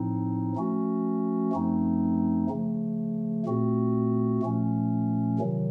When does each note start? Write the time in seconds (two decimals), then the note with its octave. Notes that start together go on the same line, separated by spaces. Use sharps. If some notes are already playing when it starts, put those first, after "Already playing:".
Already playing: A2 F3 C4 D#4
0.56 F3 A3 C#4 F#4
1.52 F#2 F3 A3 C4 D#4
2.50 C#3 F3 A3
3.45 A#2 A3 C4 F#4
4.42 A#2 F3 A3 C#4
5.39 C3 D#3 F#3